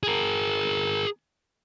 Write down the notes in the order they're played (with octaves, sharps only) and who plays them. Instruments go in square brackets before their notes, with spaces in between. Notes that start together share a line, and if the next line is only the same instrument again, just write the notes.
[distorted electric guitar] G#4 A#4